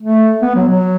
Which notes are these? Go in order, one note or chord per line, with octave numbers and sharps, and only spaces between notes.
A3
B3
F#3
F#3